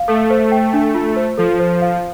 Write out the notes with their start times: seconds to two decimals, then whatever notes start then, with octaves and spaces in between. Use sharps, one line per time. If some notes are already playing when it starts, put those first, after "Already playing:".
Already playing: F5
0.08 A3 A4
0.30 C5
0.52 G5
0.73 D4
0.94 F4
1.16 C5
1.38 F3 A4
1.60 C5
1.82 F5